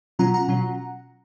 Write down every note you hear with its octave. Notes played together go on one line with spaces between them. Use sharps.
B2 F#3 C#4 F4 F#5 A#5
F#5 A#5
B2 F#3 C#4 F4